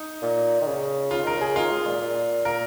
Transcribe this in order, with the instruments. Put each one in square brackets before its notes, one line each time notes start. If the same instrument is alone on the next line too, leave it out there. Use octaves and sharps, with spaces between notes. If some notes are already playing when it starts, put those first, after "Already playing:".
Already playing: [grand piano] D#4
[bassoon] A#2
D#3
C#3
[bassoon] C#3 [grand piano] F4
[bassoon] D#3 [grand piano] A#4
[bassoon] C#3 [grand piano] G#4
[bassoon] D#3 [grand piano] F4
[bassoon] G#3
A#2
A#2
[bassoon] A#2 [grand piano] A#4